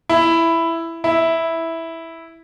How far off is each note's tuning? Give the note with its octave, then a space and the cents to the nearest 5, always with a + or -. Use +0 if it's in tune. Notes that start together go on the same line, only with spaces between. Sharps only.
E4 +5
E4 -5